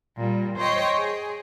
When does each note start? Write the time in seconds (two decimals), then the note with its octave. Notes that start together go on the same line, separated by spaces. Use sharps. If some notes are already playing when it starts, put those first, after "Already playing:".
0.18 A#2 G3
0.57 C5 C#5 D#5 G5
0.96 G#4